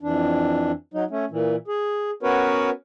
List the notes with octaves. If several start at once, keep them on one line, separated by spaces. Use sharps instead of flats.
F2 E3 D4
F#3 D#4
A3 C#4
A#2 E3
G#4
B3 C#4 F#4 A#4 B4 C#5